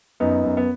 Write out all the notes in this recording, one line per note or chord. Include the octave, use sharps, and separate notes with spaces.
F#2 B3 D#4
F#2
B3